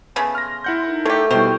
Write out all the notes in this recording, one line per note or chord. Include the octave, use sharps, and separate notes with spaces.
C#3 A3 B3 G#5
C6 F6 A#6
E4 F#5 G6
D#4 A4 A#4
F#3 A3 G4
B2 D#3 G3 E4 C5 G5 C#6